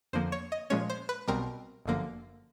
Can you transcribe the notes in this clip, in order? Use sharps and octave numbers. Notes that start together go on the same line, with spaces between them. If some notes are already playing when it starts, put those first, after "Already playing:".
F2 D3 F3 A#3 C5
C#5
D#5
A#2 F3 G#3 C#4 C#5
C5
B4
B1 B2 G3 C4 A#4
G1 F#2 D3 F3 A#3